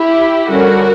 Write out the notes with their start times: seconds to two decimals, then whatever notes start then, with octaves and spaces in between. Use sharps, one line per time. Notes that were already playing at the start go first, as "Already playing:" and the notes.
Already playing: E4 G4
0.49 D3 G3 C#4 F#4 A#4